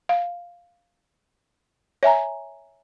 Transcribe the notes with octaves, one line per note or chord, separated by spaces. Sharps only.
F5
C#5 E5 G#5 A#5